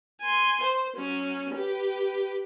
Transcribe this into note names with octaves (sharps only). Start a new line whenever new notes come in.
G#5 C6
C5
F#3 C#4
G4 B4